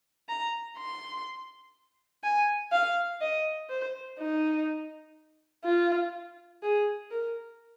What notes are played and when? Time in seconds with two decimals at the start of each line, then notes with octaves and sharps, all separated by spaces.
0.29 A#5
0.78 C6
2.24 G#5
2.72 F5
3.21 D#5
3.70 C5
4.19 D#4
5.65 F4
6.63 G#4
7.11 A#4